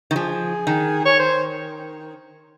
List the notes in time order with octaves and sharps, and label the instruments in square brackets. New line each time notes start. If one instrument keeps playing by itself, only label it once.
[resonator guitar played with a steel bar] D#3
[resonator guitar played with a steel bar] F3 [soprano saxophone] G#4
[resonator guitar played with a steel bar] D#3
[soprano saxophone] C#5
C5